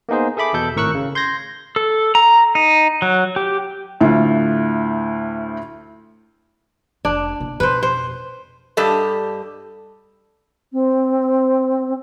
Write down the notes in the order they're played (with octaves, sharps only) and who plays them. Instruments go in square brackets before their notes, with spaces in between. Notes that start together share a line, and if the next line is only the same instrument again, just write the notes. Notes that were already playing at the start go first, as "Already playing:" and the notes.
[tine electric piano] A#3 B3 D#4 G#4 C5
G#4 A4 E5 B5 D6
E2 B2 A4 G6
G#1 A2 A#4 C#6 E6 F#6
C#3
C6 G6 G#6 A#6
[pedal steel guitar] A4
A#5
D#4
F#3
G4
[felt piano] D2 A2 F4
[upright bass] F1 [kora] D4
[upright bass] A#1 B2
[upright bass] F2 B2 [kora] B4 C5
[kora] C5
[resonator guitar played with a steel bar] G2 G3 G4 A4 D#5
[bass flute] C4